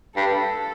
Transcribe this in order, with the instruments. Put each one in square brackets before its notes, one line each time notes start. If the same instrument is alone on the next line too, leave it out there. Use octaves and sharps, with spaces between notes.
[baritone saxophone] G2 [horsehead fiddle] A4